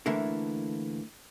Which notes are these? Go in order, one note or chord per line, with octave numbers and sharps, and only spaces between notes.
D3 E3 A3 A#3 E4